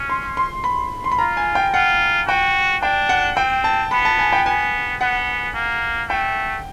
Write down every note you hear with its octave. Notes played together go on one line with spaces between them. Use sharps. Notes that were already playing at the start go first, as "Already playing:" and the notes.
Already playing: C#4
C6
C6
B5
C6
B5
F4 A#5
G#5
G5
F4 F#5
F#4 G5
D4 G5
F#5
C4 G5
A5
B3 B5
A5
G#5
G5
B3 G#5
B3 F#5
A#3
A3 G5